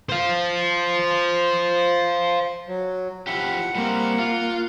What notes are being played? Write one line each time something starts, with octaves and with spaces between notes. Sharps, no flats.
C5 F5
F#3
F3 E4 G4 F#5
G3 A#3 C4
F4